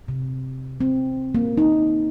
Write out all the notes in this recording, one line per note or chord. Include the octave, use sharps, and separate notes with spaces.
C3
C4
A#3
D#4